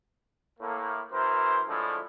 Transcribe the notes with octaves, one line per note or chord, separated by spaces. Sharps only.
A2 A#3
F#2 E3 A#4 C5
A2 D3 F3 G#3 E4